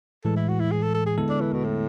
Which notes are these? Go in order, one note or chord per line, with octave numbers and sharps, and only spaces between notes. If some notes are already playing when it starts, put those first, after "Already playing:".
A2 E3 G#3 A4
E4
F#4
E4
G#4
A4
A4
G#4
D3 G#3 B3 E4 A4
D4
E3
B2
A2